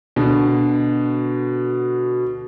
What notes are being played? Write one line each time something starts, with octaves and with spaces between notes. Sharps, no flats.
B2 D3